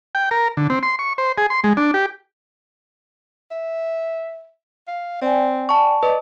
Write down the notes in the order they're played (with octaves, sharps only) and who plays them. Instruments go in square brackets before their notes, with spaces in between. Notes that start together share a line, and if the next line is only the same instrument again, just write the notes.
[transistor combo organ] G5
A#4
D3
C4
C6
C#6
C5
G#4
C6
G#3
D4
G4
[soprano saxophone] E5
F5
[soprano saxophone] C4 [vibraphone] D5 G5 G#5
[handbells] A5 C#6
[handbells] B4 [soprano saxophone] D5 [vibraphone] D#5